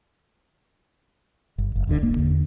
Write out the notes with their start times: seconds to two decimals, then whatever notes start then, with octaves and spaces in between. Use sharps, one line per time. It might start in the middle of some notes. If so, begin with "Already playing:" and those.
1.58 G1
1.75 F#1
1.87 E1 D2 D3
2.03 D1 G1 A#3
2.16 E2 D3